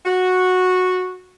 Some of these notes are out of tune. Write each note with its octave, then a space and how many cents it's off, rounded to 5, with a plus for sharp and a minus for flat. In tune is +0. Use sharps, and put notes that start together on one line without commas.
F#4 -10